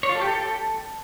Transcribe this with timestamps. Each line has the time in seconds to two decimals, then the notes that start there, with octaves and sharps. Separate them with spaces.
0.03 C#5
0.09 F4
0.15 A4
0.21 G4
0.27 A4